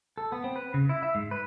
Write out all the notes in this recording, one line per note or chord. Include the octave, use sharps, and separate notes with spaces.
A4
B3
C4
B4
C#3
E4
E5
G#2
B4